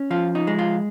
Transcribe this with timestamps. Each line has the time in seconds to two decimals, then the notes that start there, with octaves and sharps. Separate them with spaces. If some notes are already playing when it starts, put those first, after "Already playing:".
Already playing: C#4
0.11 F3 F4
0.35 D#4
0.47 G#3
0.59 F4